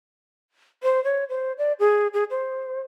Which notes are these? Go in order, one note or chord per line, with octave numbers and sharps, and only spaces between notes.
C5
C#5
C5
D5
G#4
G#4
C5